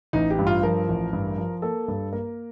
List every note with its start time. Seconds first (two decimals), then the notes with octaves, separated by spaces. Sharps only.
0.13 A1 D#4
0.30 G4
0.39 G2
0.47 F4
0.63 F3 A#4
0.89 A1
1.13 G2
1.38 F3
1.62 A#3 A4
1.88 G2
2.13 A#3 A#4